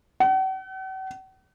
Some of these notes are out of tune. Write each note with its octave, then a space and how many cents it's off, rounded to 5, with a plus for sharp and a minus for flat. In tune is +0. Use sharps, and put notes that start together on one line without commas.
F#5 +45